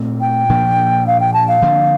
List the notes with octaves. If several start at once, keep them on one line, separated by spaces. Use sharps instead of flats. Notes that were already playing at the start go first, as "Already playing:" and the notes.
Already playing: A#2 A3 C4
G5
A#2 F3 A#3 D4
F5
G5
A5
F5
D3 F3 A#3 D4